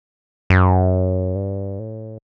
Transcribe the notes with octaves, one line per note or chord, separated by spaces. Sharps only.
F#2
G2
A2